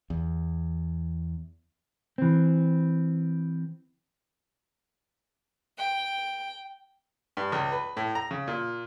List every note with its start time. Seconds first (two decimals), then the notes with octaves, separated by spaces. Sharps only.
0.10 E2
2.18 E3 C4
5.78 G5
7.37 G2
7.52 C#2
7.72 B4
7.97 A2
8.15 A#5
8.31 C#3
8.48 A#2